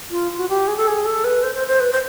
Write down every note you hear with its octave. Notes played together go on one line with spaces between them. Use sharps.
F4
F#4
G4
G#4
A4
G#4
A4
B4
C5
C5
C5
B4
C5